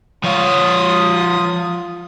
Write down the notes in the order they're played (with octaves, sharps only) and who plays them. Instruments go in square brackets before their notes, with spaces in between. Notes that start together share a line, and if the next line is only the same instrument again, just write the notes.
[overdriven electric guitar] F3 C#5 [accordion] F4 D#6